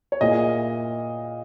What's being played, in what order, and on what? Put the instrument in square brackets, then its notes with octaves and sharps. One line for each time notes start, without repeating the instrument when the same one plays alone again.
[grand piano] C#5
[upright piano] A#2 A#3 E4 G#4 [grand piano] D#5